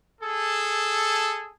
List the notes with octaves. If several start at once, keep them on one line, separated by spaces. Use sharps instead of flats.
G#4 A4